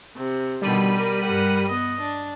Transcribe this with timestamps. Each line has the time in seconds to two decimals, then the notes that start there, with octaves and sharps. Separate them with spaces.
0.15 C3
0.62 B2 D3 D#3 G3 B5 D#7
0.92 G4 A#4
1.23 G2 A#4 F#5
1.67 B3 D#5
2.00 D4